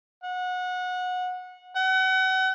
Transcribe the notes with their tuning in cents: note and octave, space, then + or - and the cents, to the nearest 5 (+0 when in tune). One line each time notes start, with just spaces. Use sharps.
F#5 -25
F#5 +35